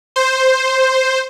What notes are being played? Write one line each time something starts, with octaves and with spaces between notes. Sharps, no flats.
C5